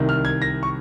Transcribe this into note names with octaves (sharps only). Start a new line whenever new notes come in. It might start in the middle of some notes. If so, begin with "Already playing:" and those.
Already playing: C2 C3 D#3
F6
G#6
A#6
C#6